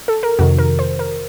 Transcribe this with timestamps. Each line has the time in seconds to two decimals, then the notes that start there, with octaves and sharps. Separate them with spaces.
0.08 A4
0.23 A#4
0.39 F2 C3 D#3 F#4
0.58 A#4
0.79 C5
0.99 A#4